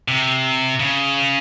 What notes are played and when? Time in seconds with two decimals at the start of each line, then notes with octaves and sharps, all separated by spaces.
0.08 C3
0.80 C#3